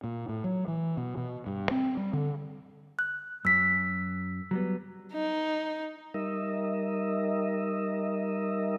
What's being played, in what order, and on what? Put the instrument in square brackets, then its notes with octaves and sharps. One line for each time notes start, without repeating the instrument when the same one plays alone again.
[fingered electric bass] A#2
A2
F#3
E3
B2
B2
G2
C4
G3
D3
[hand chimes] F#6
[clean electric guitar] F#2 [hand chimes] E6 B6
[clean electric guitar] F#3 G3 B3
[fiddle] D#4
[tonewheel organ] G3 D#4 A#4 D#5 E5